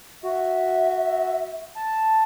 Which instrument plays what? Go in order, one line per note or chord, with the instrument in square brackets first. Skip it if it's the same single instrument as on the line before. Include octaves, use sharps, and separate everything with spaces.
[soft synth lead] F#4 [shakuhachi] E5
[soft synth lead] A5